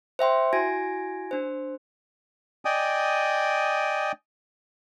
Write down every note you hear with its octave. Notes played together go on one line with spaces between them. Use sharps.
C5 E5 G5 C6
E4 F#4 G#5 G#6 A#6 D7
D4 C5
D5 D#5 G5 G#5 D#6